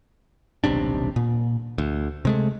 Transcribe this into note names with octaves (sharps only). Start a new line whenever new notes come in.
D#1 B1 C3 D4
A#2
D2
C3 G#3 A3